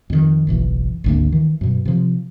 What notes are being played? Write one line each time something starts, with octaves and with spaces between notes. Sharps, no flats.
F2 D#3
F#1 B1 E3
G#1 D2 A#3
D#3 E3
F#2 B2
C3 F3